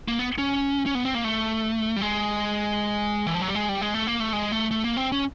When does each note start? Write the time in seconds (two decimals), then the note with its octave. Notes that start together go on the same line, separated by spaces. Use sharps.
0.08 A#3
0.19 B3
0.38 C#4
0.86 C#4
0.95 B3
1.05 C4
1.15 A#3
1.24 A3
1.96 G3
2.02 G#3
3.27 E3
3.34 F3
3.42 F#3
3.48 G3
3.55 G#3
3.69 G3
3.81 G#3
3.94 A3
4.07 A#3
4.20 A3
4.33 G#3
4.52 A3
4.71 A3
4.84 A#3
4.97 C4
5.12 C#4